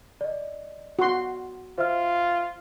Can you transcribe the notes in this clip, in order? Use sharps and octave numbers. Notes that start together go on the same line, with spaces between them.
D5 D#5
F#4 C6
F4 C5 E5 F6